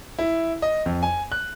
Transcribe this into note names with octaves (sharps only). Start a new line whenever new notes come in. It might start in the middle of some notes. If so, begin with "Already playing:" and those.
E4
D#5
F2
G#5
F#6